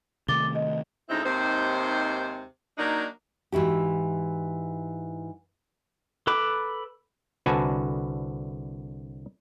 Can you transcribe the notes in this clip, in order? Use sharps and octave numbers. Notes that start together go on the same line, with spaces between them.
C3 D#3 A3 D6 A6 G7
D#5
D2 C#3 G#3 C4 D#4 E4
D#2 C3 G#3 D#4 C5
F#3 A#3 D4 D#4
G#2 E3 E4 F#4 G4
A4 B4 B5 D6
C2 D3 F#4 B4 G#5 A5